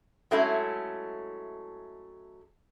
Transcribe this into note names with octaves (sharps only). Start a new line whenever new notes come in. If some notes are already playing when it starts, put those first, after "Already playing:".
F#3 G#3 A3 C#4 E4